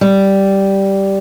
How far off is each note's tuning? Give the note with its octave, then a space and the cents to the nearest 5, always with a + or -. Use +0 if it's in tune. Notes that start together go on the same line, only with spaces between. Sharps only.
G3 -5